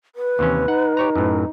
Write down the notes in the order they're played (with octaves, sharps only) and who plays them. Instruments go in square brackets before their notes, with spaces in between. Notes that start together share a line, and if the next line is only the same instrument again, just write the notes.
[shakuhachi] B4
[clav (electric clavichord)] D#2 C3 C#4 [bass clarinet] E3
[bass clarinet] D#4 [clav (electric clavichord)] F#5
[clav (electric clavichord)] G4 C#5 A#5
F#2 A2